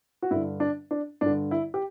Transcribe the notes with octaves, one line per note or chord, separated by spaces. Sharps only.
F#4
G2 D3 E4
D4
D4
G2 D3 D4
E4
G4